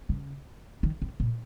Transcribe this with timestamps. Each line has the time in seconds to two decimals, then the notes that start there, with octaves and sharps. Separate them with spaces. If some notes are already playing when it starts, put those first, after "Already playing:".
0.09 C#3
0.83 D#3
1.02 C3
1.20 A#2